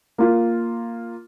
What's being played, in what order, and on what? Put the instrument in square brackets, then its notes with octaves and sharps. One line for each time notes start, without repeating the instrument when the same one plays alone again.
[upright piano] A#3 F4